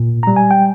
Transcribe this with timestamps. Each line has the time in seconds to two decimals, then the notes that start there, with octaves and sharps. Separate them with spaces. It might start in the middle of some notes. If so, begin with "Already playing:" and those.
Already playing: A#2
0.23 G3 A#5
0.36 G#5
0.51 G5